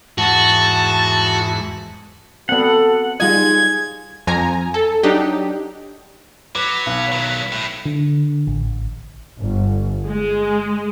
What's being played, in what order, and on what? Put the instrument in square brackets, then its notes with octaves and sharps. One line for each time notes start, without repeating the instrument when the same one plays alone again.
[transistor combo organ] E2 G#2 [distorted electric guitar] F#4 [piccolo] A5
[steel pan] B3 C4 [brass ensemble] F#4 A4 [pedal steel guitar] F#5
[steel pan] G3 F4 D#5 [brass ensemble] D#4 G#4 [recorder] G#6
[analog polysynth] F2 F3 G#5 A#5
A4
F#3 D4 D#4 G4
[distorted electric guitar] F#3 [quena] B4 [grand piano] D6
[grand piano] B1
[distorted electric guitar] D#3 F#3
A2
[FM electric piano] D3
A1
[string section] G1
G#3